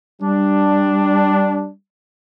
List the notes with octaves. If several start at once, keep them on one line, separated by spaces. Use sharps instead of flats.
G3 D4